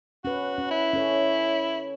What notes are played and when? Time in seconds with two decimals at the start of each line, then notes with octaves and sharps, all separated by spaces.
0.25 C#4 F#4 B4
0.58 C#4
0.71 E4
0.93 C#4 A4 C#5